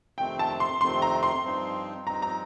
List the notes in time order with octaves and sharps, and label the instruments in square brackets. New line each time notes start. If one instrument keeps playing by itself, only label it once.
[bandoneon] F2 C3 D#3 A3 C4 [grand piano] G5
[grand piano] A5
C6
[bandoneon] F2 C3 D#3 A3 C4 [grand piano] C6
[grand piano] A#5
C6
[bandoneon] G2 F3 C4 D#4
[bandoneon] G2 F3 C4 D#4 [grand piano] A#5
[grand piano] A#5